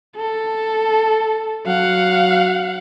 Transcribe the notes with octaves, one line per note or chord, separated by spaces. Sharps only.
A4
F#3 F5 F#5